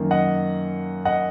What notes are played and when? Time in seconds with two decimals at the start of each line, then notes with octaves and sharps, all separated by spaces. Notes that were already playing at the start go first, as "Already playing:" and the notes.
Already playing: F#2 D#3 A#3
0.11 D#5 F#5
1.05 D#5 F#5